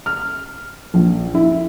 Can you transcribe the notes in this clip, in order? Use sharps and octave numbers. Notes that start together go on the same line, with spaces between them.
F6
A#1
E4